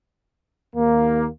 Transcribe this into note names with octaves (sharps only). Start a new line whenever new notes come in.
D#2 A#3